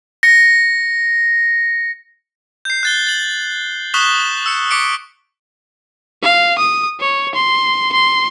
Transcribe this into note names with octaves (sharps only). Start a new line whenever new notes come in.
A#6 C#7
G6 C7
F#6 A6 G7
A6 F#7
C#6 D#6 F#6 B6 E7 G7
E6 C#7
D6 B6 C#7 D7
F5
D#6
C#5
C6
C6